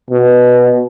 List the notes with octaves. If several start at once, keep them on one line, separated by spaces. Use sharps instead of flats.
B2